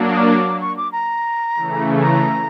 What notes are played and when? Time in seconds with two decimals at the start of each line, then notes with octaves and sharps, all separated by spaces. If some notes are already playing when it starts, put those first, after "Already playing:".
Already playing: F#3 A#3 D4
0.14 D#6
0.17 D6
0.61 C#6
0.77 D6
0.92 A#5
1.55 C#3 E3 A3
2.02 A#5